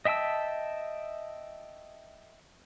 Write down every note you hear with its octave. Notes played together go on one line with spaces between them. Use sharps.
D#5 E5 G5 A5 E6